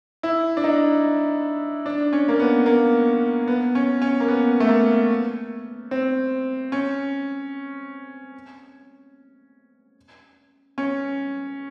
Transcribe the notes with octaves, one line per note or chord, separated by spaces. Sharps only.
E4
D4
D#4
D4
C#4
A#3
B3
A#3
B3
C#4
C#4
A#3
B3
A3
A#3
C4
C#4
C#4